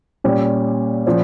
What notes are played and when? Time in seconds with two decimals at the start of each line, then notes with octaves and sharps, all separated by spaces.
0.24 A#2 G3 C#4 G4
1.07 A#2 F3 C#4